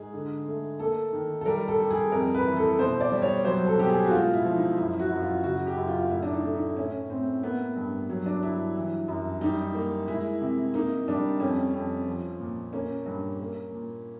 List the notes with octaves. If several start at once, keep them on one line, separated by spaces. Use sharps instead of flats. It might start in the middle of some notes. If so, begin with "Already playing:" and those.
Already playing: G#2 G#4
D3
A3
A#3 A4
D#3
A4
G3 A#4
A4
G3
G#4
F2 A#4
B4
E3
A4
B2 C5
D5
G3
C#5
F#3 C5
A4
B2 G4
G#4
F#4
G#3 F4
E4
F3
D#4
F#2 E4
F#4
F#2
F4
C#3 F#4
G4
F#2
F4
F4
A2 E4
D4
D#4
A3
D#4
A2 C#4
A2 C4
A#3 B3
G2
F#3
D4
G2 E4
E3
F#2
G3 D#4
A#3
G#3 E4
C3
A#3 D#4
G3 D4
F2 C#4
F2
F3
A#2
A#3 C#4
G2
A#3
A#2